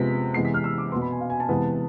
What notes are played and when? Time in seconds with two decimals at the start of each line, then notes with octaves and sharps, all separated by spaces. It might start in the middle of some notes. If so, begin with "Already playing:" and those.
Already playing: C3 F3 G#3 B3 B6
0.34 C3 E3 G#3 B3 C7
0.45 B6
0.54 F6
0.64 E6
0.78 D6
0.92 B3 C6
0.95 B2
1.01 B5
1.11 G#5
1.21 F5
1.30 G#5
1.40 A5
1.49 C3 E3 G#3 B3